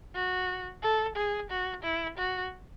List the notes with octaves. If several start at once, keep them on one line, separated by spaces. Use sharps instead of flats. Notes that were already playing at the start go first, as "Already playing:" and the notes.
F#4
A4
G#4
F#4
E4
F#4